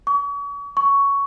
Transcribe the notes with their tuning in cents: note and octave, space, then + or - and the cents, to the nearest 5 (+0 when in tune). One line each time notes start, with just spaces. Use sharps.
C#6 +40
C#6 +10